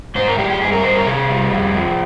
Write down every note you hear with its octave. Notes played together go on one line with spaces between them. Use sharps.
G#2 C5
A#4
G#3 G4
G4
G2 G#4
A#4
G2 C5
A#4
C3 G#4
G3
F2
F3